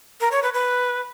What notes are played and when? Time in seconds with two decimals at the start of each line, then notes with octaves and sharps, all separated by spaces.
0.21 A#4
0.32 C#5
0.43 B4
0.54 B4